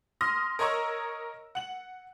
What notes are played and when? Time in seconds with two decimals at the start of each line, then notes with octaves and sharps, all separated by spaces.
0.21 C6 D#6 F6 A#6
0.59 A#4 C#5 D#5 A#5 C#6 E6
1.55 F#5 F#7